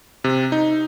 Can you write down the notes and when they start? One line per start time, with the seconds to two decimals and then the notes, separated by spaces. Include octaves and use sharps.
0.24 C3
0.52 D#4